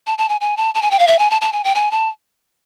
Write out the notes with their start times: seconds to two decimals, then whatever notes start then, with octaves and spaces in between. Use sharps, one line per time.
0.06 A5
0.18 A5
0.29 G#5
0.41 G#5
0.57 A5
0.74 A5
0.82 G#5
0.91 G5
0.99 F5
1.07 E5
1.19 G#5
1.30 A5
1.41 A5
1.52 G#5
1.64 G5
1.75 G#5
1.91 A5